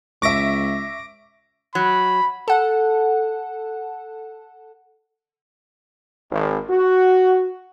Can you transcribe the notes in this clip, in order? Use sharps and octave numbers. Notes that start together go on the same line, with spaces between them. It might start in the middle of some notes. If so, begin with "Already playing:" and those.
C#2 E5 C#6 D6 A#6 D7
F#3 B5
A4 F#5
G#1
F#4